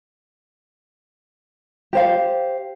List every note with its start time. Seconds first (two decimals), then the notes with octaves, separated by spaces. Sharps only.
1.93 G4 C5 F5